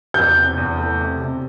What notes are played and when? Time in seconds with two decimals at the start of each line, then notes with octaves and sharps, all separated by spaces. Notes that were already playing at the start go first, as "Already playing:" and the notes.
0.14 E2 G6
0.36 C3
0.58 E2
0.78 A3
1.00 C3
1.21 C3